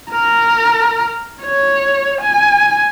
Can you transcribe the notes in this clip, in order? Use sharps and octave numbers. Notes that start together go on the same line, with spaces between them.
A#4
C#5
G#5